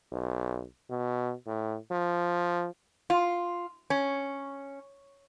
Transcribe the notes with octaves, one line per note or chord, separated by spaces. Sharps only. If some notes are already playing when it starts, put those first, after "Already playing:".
B1
B2
A2
F3
F4
C#4